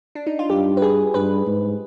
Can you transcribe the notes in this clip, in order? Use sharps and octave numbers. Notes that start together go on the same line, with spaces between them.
D4
D#4
F4
G2 G4
B4
G#4
G2 B4
G#2